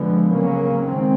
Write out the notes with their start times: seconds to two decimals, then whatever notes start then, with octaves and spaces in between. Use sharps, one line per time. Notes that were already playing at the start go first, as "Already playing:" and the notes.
Already playing: D3 F3 G#3 B3
0.33 C#3 F#3 A#3 C#4
0.84 D#3 G#3 C4